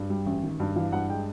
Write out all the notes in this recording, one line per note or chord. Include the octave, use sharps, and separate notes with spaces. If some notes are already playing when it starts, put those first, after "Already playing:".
Already playing: G2
G3
A1
D#3
G2
E3 F5
G2 F#5
G#3 G5